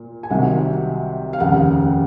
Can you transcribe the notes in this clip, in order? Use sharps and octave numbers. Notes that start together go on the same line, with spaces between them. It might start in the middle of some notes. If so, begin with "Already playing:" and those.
Already playing: A#2 A#3
G#5
C2 C3 D#3 F#3 F#5
F5
F1 D#2 C#3 F#5